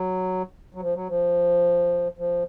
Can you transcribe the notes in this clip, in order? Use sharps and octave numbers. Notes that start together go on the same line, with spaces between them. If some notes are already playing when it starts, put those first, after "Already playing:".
Already playing: F#3
F#3
F3
F#3
F3
F3